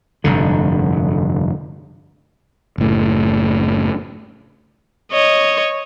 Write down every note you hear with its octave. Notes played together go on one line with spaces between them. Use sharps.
F1 G2 D3
F#1 A2
C#5 D#5